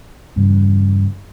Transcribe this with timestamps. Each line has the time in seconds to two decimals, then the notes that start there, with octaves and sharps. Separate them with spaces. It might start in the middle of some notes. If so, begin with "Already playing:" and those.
0.36 E2 G2 C#3